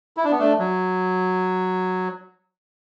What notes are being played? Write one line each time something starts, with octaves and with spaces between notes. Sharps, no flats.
E4
D4
B3
A3 D4
F#3